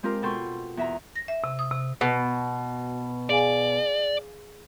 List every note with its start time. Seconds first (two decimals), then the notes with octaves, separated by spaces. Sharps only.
0.03 G#3 C4 F4 G4 A#4
0.22 B2 A4 G5 C6 C#6
0.77 E2 E5 A#5
1.16 A#6
1.28 E5
1.44 C3
1.59 D#6
1.71 C3
2.01 B2
3.30 G#4 D5 F5 G#5